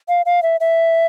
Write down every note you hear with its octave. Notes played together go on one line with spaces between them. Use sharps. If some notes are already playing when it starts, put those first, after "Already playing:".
F5
F5
E5
E5